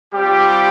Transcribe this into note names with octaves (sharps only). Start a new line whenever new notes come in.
G3 C4 F4 G4